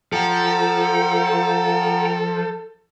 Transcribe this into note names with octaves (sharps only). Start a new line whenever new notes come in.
F3 A4 F#5 G5 A#5